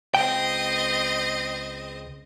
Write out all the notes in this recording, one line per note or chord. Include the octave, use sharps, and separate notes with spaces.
C#2 C4 D#5 G5